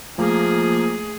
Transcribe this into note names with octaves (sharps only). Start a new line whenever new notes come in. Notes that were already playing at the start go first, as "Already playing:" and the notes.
F3 A3 A#3 G#4